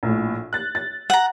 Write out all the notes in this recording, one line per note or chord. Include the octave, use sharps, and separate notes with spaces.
A#1 A2
F#6 A6
A6
F#5 A#5